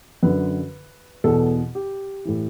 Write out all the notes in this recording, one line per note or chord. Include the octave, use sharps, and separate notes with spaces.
F#2 D3 B4
E2 B2 A4
G4
A2 E3